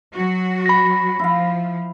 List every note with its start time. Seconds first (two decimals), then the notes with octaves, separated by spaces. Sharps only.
0.15 F#3 F#4
0.66 B5 A#6
1.19 F3 E4 F5